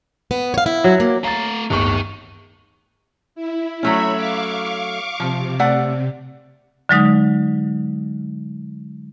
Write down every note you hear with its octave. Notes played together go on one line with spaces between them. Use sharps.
B3
C#5 F5
E4
F#3
A#3
A3 F5 A#5 A6
D1 G1 D#4 A#4 C#6
E4
F#3 A3 C#4 C#5 E5 B5
F5 C#6 D6
C3 F3
A3 D5 F#5
D3 F#3 G#3 D#4